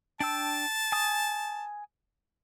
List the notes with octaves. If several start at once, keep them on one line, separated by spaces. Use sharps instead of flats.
D4 G5 A5 E6
G#5 D#6